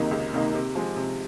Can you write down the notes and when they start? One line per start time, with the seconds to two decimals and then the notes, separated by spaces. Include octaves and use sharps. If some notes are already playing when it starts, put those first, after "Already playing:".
Already playing: C#2 C3 D#3 A#3 D#4
0.11 C#2
0.33 C3 D#3 A#3 D#4
0.54 C3
0.75 F3 G#3
0.96 C3